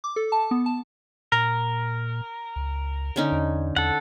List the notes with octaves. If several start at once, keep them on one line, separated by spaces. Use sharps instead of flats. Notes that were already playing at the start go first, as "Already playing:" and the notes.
D6
A4
A5
B3
A5
A#2 A#4
C#2
D3 C#4 D#4
E2
E2 A4 F#5